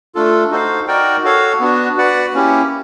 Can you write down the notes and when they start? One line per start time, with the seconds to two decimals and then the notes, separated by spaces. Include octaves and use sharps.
0.15 A3 D4 F4 A4
0.51 D#4 F#4 A4 C5 F5
0.88 D#4 F#4 A#4 D5 G5
1.23 F#4 A4 C#5 F5
1.60 B3 D4 F#4
1.97 F#4 B4 D5 F#5
2.33 A#3 C#4 E4 G4